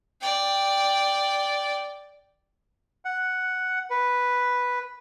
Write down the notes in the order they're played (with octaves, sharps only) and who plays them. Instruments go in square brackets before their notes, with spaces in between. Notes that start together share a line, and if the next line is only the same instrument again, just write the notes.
[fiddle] D5 G5
[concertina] F#5
B4